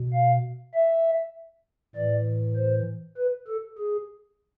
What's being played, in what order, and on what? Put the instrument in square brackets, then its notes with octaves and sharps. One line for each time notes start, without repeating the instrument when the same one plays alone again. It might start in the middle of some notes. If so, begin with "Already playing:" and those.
Already playing: [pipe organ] B2
F5
E5
A2 E3 D5
C5
B4
A4
G#4